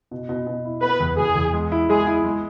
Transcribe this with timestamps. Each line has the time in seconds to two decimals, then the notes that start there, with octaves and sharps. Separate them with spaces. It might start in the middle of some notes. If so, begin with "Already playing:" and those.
0.11 B2
0.29 B2
0.47 B2
0.65 E4
0.83 B3 B4
1.00 E2
1.18 E2 G#4
1.35 E2
1.54 G#3
1.72 E4
1.89 G#3 G#4
2.07 E4
2.24 G#3